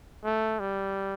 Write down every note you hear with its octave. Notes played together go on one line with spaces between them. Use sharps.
A3
G3